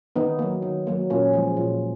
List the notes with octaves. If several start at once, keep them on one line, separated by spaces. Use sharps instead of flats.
D#3 B3 D#4
F#3 A#3
D#3
F#3 A#3
A#2 A#3 C#4
F3 G#3
A#2